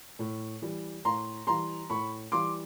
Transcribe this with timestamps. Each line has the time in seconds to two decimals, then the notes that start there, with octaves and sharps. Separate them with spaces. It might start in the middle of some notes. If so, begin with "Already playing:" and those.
0.19 A2
0.62 E3 G3
1.05 A2 A#5 C6
1.47 E3 G3 A#5 C6
1.90 A2 B5 C#6
2.32 E3 G3 C6 D6